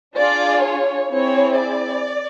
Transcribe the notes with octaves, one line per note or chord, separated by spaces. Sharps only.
D4 F4 G#4 D5
C#5
C4 E4 G#4 C#5
D5